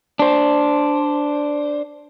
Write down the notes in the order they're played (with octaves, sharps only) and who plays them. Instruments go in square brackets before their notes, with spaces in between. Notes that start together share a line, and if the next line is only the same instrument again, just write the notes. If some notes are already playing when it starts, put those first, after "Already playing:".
[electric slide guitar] D4 C5